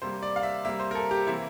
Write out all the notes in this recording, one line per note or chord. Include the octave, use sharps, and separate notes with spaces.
C3 G3 A#3 C5
D5
F5
E5
C3 G3 A#3 E5
C5
A#4
A4
G4
C3 E3 A#3 E4